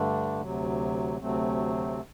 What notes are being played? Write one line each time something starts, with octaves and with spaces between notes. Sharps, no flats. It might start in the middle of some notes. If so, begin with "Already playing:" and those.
Already playing: G2 D3 A3 D4
D2 C3 F#3
D2 C3 F#3 A3 C4